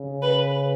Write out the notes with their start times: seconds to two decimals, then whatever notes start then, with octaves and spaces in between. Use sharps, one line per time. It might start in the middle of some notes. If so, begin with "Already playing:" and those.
Already playing: C#3
0.22 B4